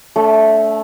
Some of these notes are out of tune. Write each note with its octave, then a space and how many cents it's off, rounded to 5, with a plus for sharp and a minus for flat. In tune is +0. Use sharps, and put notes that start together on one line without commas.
A3 -5 D4 -45